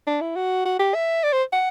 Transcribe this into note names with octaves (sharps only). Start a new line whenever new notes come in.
D4
E4
F#4
F#4
G4
E5
D5
C5
F#5